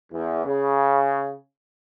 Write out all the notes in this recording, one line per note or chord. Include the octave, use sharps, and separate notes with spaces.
E2
C#3